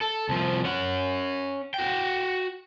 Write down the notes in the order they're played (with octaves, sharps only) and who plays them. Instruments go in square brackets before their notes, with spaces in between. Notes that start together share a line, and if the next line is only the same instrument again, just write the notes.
[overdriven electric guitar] A4
C2 F3
C#4 F#5
F#4 G5